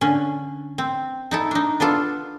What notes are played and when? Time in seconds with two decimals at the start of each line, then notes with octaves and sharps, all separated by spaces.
0.01 D3 C#4
0.78 C4
1.31 D#4 E4 A4
1.51 D4 D#4
1.80 B3 D4 F4 A4